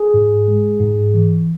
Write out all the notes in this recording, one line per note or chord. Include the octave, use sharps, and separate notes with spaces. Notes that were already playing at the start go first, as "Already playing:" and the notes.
Already playing: G#4
G#2
G#3
G#2
E3